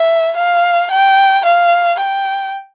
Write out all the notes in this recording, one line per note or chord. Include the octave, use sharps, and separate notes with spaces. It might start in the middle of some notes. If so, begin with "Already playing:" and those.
Already playing: E5
F5
G5
F5
G5